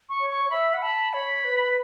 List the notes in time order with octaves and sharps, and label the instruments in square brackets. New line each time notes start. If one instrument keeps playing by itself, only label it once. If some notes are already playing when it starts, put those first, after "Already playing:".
[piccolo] C#6
[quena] C#5
[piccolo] C#6
[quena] C#5
[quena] E5 [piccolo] B5
[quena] F#5
[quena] A5 [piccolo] B5
[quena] C#5 [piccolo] B5
[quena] B4